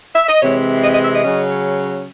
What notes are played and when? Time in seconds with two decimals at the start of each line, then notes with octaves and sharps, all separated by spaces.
0.15 E5
0.29 D#5
0.42 C3 E3 G#3 C4 C#5
0.83 D#5
0.94 D#5
1.04 E5
1.14 D#5
1.24 C#3 F#3 C#4